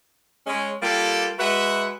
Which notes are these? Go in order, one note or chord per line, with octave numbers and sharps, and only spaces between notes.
G#3 C#4
G3 A#3 F4 G4 A4
G#3 F#4 B4 E5 F#5